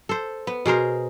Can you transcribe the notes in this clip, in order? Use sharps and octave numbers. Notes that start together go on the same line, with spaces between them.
A4 C5
B3
B2 G#4 A#4 C5